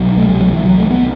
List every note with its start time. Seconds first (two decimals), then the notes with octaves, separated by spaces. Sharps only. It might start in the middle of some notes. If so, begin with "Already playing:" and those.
Already playing: C2 B2 F#3
0.17 A3
0.29 G3
0.41 F#3
0.53 E3
0.65 F#3
0.78 A3
0.90 B3